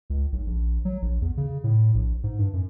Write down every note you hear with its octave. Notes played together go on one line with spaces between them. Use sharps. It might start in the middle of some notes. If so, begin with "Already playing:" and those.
C#2
B1
A#1
F#3
A#1
E2
C#3
A2
A#1
G#2
G2
F#2